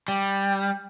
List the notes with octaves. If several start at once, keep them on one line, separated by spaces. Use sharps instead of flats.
G3